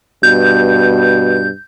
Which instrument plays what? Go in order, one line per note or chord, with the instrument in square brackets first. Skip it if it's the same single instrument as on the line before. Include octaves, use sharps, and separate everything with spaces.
[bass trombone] G2 [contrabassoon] B2 [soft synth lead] G6